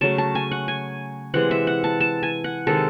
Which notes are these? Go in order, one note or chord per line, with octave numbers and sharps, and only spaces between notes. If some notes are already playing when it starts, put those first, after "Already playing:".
C#3 F#3 A3 A5
A5
G#5
F#5
G#5
C3 E3 G#3 F#5
E5
F#5
A5
A5
G#5
F#5
C3 D#3 G#3 A4